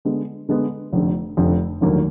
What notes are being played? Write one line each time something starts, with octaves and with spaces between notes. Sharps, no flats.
D3 G#3 B3
D3 G#3 B3
F1 F2 D3
F1 F2 D3
F1 D#2 D3 F#3 A#3